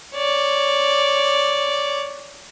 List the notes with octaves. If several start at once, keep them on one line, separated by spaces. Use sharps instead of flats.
C#5 D5